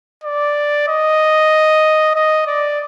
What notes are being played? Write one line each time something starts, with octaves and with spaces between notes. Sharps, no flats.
D5
D#5
D#5
D5